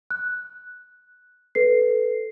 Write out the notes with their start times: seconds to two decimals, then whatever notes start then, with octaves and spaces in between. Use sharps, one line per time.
0.11 F#6
1.55 A4 B4 C7